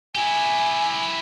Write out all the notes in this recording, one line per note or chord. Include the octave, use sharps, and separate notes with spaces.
E4 G4 G#5